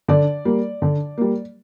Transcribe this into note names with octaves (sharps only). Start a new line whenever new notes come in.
D3 D5
G3 A#3
D3
G3 A#3